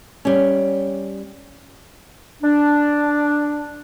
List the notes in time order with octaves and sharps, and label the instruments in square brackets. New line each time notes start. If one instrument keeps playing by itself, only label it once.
[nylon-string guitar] G3 C#4
[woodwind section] D4